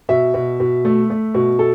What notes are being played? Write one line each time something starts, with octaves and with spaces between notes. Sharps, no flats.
B2 E5
B2
B2
A3
A3
B2
A4